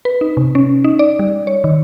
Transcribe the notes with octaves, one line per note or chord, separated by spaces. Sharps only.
B4
D#4
C3
C#4
D#4
D5
G3
C#5
D#3